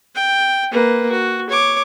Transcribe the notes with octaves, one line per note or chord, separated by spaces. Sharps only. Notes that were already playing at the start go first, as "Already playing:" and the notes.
G5
A#3 B4
F#4
C#5 D6